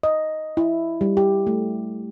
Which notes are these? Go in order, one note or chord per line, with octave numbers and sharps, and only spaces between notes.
D#5
E4
G3
G4
A3